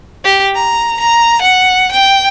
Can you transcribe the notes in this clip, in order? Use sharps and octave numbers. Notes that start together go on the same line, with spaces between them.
G4
A#5
A#5
F#5
G5